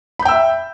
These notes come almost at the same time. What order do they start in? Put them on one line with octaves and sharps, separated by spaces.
B5 G6 G5 E6 E5